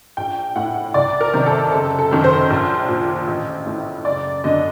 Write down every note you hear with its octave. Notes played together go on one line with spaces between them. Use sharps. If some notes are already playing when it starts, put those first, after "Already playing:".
A#1 G5
A2 F#5
C2 D5
A#4
C3 D#3
A4
F#1 A4
A4
F#2 D#3
C5
A#1
A#2
A1
A2
F#1 D5
F#2 D3 D#5